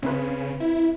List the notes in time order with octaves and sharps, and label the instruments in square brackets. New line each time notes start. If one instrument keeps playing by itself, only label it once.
[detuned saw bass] C#3 [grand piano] C4 B4
[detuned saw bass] E4